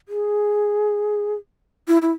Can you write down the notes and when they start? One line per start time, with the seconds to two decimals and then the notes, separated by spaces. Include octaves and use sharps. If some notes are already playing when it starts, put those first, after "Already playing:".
0.08 G#4
1.88 E4
2.02 E4